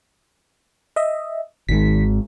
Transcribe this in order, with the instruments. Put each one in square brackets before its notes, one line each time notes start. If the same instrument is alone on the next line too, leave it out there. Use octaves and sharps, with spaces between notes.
[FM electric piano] D#5 E5
[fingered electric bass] G#1 G#2 [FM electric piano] D#3 B6